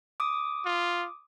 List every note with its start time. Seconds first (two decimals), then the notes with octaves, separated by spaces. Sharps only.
0.20 D6 D#6
0.65 F4